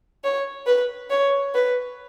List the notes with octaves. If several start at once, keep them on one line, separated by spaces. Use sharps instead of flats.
C#5
B4
C#5
B4